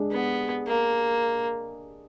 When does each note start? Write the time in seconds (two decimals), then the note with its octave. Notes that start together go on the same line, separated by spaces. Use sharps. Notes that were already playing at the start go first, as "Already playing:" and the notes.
Already playing: G#3 D4 G#4
0.11 B3
0.67 A#3